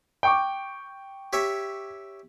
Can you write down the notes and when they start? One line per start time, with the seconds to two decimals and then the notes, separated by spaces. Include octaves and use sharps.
0.23 G5 C#6 D6
1.33 G4 C#5 E5